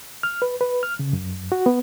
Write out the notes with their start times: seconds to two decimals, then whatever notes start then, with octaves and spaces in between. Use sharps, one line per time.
0.23 F6
0.42 B4
0.61 B4
0.83 F6
0.99 C#3
1.13 F#2
1.52 F#4
1.66 B3